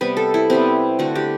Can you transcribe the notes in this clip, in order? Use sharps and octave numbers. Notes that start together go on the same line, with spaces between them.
C3 G3 B3 B4
A4
E4
C3 G3 B3 C4
D3 A3 F#4
G4